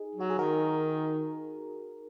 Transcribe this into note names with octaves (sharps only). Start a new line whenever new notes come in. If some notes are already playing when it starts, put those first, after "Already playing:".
Already playing: D#4 G#4
F#3 F#4
G#4
D#3 F#4 A#4